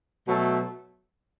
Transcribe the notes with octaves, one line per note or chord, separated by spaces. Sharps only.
B2 F#3 A3